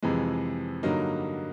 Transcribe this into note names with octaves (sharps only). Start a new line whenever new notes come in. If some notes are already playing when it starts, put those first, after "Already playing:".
F2 C3 E3 G#3
G2 D3 F#3 A#3 D#4